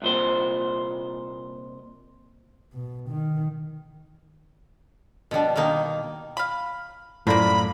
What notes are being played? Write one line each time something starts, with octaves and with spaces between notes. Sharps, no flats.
C2 A#2 C5
B2
D#3
B2 F3 G3 D4
B2 D#3 A#3 D#4
F5 B5
F#2 A2 F3 A#3 E4 A4 D5 B5